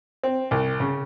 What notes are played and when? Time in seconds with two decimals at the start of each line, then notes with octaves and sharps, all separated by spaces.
0.23 C4
0.51 C2
0.80 C#3